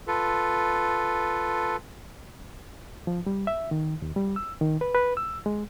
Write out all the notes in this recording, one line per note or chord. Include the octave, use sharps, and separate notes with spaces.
F4 A4 B4
F3
G3
E5
D#3
D#2
G3
E6
D#3
B4
B4
E6
G#3